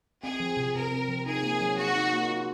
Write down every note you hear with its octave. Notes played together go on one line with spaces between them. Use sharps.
C4 G#4
F3
C3
C3 A#4
C4
F3
D#4 G#4
A#3
F#3
F#4 G#4
D#4
A#3
F4